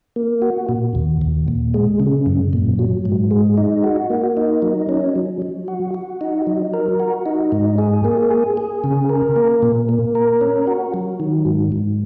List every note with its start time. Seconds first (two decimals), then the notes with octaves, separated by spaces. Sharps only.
0.16 A#3
0.42 F#4
0.69 A#2
0.95 D#2
1.21 D#2
1.48 A#2
1.74 G#3
2.00 C#3
2.26 F#2
2.53 A#2
2.79 F#3
3.05 G#2
3.31 G#3
3.57 D#4
3.84 F#4
4.10 A#3
4.37 D#4
4.62 F#3
4.89 C#4
5.16 F#3
5.42 F#3
5.68 F#4
5.94 F#4
6.21 D#4
6.47 F#3
6.74 A#4
7.00 F#4
7.26 D#4
7.52 G#2
7.78 G#4
8.05 A#3
8.30 G#4
8.57 G#4
8.84 C#3
9.09 A#4
9.36 A#3
9.62 A#2
9.89 A#3
10.15 A#4
10.41 C#4
10.67 F#4
10.94 F#3
11.20 D#3
11.46 G#2
11.72 G#2